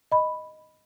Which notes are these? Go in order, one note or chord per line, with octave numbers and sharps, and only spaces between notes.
D#5 B5